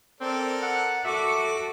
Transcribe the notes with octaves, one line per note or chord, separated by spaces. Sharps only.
C4 A4 A#4 D5
F#5
F#4 A4 E5 D6